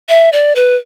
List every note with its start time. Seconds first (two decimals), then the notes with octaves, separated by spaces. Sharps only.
0.09 E5
0.33 D5
0.56 B4